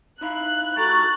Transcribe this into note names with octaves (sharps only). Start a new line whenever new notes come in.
D#4 E4 F5 F#6
G#2 F#4 G4 A4 A#5 C#6 A6